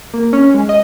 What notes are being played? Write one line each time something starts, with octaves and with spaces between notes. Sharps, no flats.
A#3
C#4
G#3
D#5